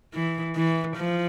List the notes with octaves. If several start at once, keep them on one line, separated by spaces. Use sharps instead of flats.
E3
E3
F3